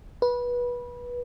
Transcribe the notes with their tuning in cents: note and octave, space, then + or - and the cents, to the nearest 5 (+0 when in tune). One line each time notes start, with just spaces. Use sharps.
B4 -20